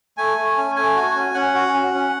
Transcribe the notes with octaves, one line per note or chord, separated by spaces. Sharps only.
A3 G#5
A3
C#4
A3 G#5
F#4
C#4
C#4 F#5
F#4
C#4
C#4